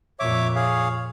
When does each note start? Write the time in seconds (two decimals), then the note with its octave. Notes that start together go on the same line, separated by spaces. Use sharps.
0.20 F2 A#2 C#5 E5 D6
0.55 G#4 C#5 F5